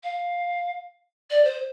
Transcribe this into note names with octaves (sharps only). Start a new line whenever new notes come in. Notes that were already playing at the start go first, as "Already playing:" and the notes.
F5
D5
C5